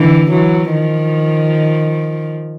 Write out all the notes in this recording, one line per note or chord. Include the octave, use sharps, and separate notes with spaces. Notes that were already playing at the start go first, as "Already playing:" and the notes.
Already playing: D3 E3
E3 F#3
D#3 F3